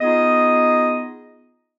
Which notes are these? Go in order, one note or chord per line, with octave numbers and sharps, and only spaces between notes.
B3 D#4 F4 G#4 D#5